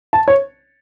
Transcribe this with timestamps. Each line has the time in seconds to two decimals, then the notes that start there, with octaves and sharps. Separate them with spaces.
0.13 A5
0.28 C#5